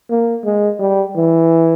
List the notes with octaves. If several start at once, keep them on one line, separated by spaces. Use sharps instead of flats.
A#3
G#3
G3
E3